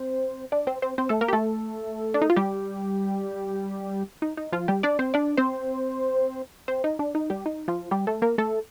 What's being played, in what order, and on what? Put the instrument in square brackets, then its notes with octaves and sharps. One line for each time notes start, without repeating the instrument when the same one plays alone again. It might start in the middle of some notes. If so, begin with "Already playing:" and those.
Already playing: [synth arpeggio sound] C4 C5
D4 D5
C4 C5
C4 C5
C4 C5
A3 A4
A#3 A#4
G4
A3 A4
D4
D#4
F4
G3 G4
D#4
D#4
F3 F4
G3 G4
D4 D5
C4 C5
D4 D5
C4 C5
C4 C5
D#4
D4
D#4
G3 G4
D#4
F3 F4
G3 G4
A3 A4
A#3 A#4
A3 A4